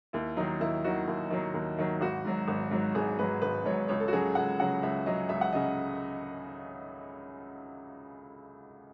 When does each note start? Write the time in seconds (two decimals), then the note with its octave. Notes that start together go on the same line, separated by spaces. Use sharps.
0.13 D#2 E4
0.37 D#3 F#3 D#4
0.60 D#2 E4
0.84 D#3 F#3 F#4
1.07 D#2 E4
1.30 D#3 F#3
1.54 D#2
1.79 D#3 F#3
2.01 G#1 F#4
2.25 G#2 F#3
2.48 G#1
2.71 G#2 F#3
2.95 G#1 G#4
3.19 G#2 F#3 B4
3.42 G#1 B4
3.66 G#2 F#3 C#5
3.88 C#2 C#5
4.00 A4
4.08 F#4
4.13 C#3 F#3 G#4
4.35 C#2 F#5
4.60 C#3 F#3 F#5
4.83 C#2 E5
5.06 C#3 F#3 D#5
5.29 C#2 E5
5.41 F#5
5.53 C#3 F#3 D#5